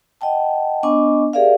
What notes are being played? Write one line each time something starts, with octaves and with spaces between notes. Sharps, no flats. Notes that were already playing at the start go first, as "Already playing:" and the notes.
D#5 F#5 G5 A5
B3 D4 D#5 G#5 C#6 D6
G4 G#4 A#4 D5 E5 F5